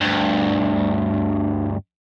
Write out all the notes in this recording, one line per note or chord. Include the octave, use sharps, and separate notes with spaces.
D2 G2